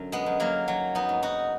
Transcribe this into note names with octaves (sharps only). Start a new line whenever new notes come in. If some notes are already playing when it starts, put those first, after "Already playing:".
Already playing: F#2 D3
G#3 B3
F#2
F#3 A#3
D#3 F#3
B3 D#4
G#2
D#4 F#4